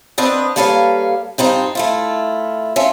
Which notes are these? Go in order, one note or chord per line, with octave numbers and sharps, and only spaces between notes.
B3 C4 D4 B4 D#5
G3 A#3 A4 B4 C#5 F5
G2 C4 D#4 F4
A3 E4 F4
C#4 F4 A4 E5